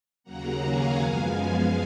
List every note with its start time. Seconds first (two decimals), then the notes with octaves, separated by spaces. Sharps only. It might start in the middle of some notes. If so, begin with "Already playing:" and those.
0.24 D#2 C#3 F#3 A#3 F#5 A#5
0.63 F5 G#5
1.01 F#2 F3 G#3 B3 F5 G#5